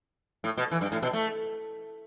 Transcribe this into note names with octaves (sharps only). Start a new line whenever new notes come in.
A2
B2
E3
G2
A2
B2
A3